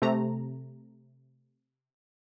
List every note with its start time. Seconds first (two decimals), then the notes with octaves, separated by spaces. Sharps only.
0.02 C3 A3 A#5